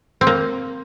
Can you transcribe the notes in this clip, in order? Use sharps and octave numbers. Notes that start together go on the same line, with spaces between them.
C4
A#3